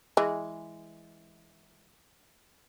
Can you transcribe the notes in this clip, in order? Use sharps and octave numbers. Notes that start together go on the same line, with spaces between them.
E3 G#3